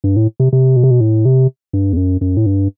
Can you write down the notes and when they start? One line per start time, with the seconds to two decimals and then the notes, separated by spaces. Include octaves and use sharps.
0.04 G2
0.16 A2
0.40 C3
0.53 C3
0.76 B2
0.83 C3
0.91 B2
1.01 A2
1.25 C3
1.73 G2
1.93 E2
1.97 F#2
2.21 F#2
2.37 A2
2.46 G2